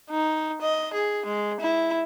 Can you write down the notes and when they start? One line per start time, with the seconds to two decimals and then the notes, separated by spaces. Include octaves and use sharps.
0.10 D#4
0.62 D#5
0.94 G#4
1.26 G#3
1.61 E4